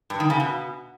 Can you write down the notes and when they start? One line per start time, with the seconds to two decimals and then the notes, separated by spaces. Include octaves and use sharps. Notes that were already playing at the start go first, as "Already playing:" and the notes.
0.10 G2
0.20 D#3
0.30 C#3
0.40 B2